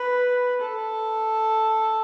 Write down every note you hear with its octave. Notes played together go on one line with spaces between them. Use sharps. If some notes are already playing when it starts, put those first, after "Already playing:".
Already playing: B4
A4